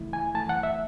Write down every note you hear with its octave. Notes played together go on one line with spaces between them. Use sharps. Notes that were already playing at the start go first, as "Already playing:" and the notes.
Already playing: C#3 E3 A3 E4
G#5
F#2 E3 A3 A5
F#5
E5